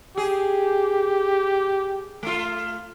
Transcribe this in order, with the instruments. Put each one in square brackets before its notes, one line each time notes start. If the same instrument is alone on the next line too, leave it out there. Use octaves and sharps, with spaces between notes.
[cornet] G4 [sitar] G#4
[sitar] A3 F4